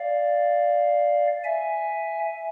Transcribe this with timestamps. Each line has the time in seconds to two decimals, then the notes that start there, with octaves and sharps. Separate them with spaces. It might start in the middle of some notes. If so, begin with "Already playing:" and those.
Already playing: D5 F5
1.44 E5 G#5